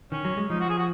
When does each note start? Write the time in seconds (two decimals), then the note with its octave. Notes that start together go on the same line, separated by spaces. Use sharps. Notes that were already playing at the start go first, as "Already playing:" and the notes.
0.12 D#3 C#4
0.25 F#3
0.37 G#3
0.50 F3 D#4
0.60 F#4
0.69 G#4
0.78 F#4